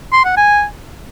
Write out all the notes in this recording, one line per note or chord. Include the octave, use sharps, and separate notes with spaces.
C6
F#5
G#5